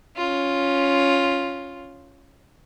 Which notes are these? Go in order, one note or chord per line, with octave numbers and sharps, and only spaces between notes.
C#4 F4